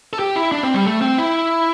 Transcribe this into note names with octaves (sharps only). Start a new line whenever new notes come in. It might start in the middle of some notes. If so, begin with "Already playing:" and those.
A4
G4
E4
D4
C4
G3
A3
C4
E4